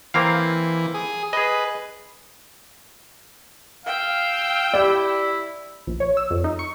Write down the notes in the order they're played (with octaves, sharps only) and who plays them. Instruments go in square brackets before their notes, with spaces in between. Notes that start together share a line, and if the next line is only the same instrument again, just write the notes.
[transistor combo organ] E3 [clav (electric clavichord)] A#3 C4 F5
[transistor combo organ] G#4
[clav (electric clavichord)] G#4 D#5 [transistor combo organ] B4
[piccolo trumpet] F5 [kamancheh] G5 E6
[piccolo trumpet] E4 [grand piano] G4 D5
[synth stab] A#1
C#5
E6
F2
D#4
C#6